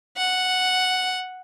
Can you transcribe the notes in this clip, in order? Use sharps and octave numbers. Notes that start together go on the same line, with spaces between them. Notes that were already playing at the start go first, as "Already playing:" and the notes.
F#5